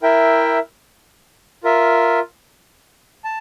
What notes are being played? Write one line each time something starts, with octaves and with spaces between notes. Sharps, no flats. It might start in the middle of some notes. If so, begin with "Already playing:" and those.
E4 A#4 E5 G5
F4 A#4 E5
A5